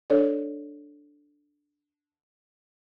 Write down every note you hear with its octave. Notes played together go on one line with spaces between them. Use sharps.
D4 A4 C#5 D5